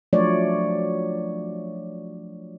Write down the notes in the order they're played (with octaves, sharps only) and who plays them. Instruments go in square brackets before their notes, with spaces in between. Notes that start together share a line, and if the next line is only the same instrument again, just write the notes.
[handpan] F3 F#3 A3 D4 C#5 D5